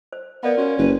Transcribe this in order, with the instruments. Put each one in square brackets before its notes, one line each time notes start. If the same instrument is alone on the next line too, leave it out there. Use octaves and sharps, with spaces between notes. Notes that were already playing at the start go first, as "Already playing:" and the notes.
[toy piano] C5
[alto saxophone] B3 [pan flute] A#4 [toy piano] D5 F5 B5
[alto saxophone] C#4 [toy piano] F#4
[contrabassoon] F#1 [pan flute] B4